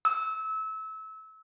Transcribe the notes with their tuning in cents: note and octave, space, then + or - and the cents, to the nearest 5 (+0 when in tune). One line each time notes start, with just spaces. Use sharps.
E6 -25